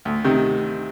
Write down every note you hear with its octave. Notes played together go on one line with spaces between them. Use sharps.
D2
C3 D#3